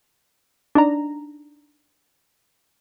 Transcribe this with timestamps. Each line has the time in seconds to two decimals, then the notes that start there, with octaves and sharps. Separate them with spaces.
0.75 D4 D#4 A#5